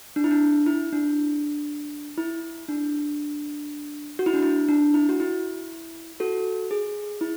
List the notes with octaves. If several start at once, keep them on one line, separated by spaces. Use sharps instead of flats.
D4
E4
D4
E4
D4
E4
D4
F#4
E4
D4
E4
D4
E4
F#4
E4
F#4 A4
G#4
E4